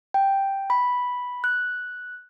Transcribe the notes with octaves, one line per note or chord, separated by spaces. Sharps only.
G5
B5
F#6